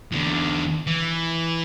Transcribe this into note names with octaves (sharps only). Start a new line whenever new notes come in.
E2 D3
E3